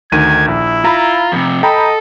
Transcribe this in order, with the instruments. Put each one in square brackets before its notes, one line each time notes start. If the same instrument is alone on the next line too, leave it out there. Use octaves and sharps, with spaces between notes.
[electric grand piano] D2 D#3 D#7 [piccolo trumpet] G#6
[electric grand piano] A#1 [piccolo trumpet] E4
[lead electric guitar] F4 [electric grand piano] A#5 B5
[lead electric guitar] F2 C3
[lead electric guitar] A4 [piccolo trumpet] D#5 [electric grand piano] G5 A#5 B5